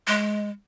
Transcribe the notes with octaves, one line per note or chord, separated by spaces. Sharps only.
G#3